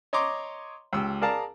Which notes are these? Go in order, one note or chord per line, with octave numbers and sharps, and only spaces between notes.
C#5 D#5 A#5 C6 D6
C#2 G4 E6
G#4 A#4 D5 F5 A5 A#5